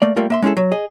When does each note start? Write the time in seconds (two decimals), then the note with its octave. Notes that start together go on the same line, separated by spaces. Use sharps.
0.02 A3 A#3 D5
0.16 G3 A3 A#3 F4 A#4
0.30 A#3 E5 C6
0.42 G#3 C#4 E4 G#4 A4
0.57 F#3
0.72 G#4 D#5